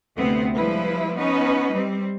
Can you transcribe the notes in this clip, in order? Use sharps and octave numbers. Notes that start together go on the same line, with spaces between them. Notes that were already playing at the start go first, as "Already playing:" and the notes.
D2 C3 B3 C4
F3 G3 G#3 E4 B4
B3 C#4 D#4 B4
G3 C4